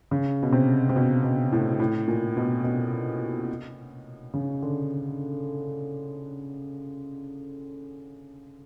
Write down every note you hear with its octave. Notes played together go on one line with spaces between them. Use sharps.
C#3
B2
C3
C3
B2
B2
A2
A2
A#2
B2
B2
C#3
D3